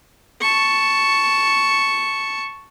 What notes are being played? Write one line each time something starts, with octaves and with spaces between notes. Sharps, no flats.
A5 C#6